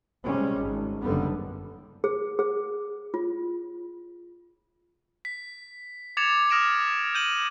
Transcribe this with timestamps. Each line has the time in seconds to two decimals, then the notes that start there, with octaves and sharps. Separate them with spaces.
0.24 C3 G3 G#3 C#4
0.58 G#1
1.02 F#1 D3 G3 B3
2.04 G#4
2.39 G#4
3.14 F4
5.25 B6
6.17 D6 G#6 A6 C#7 E7 F7
6.50 D#6 F6 A#6 D7 E7 F7
7.15 G6 D#7 F#7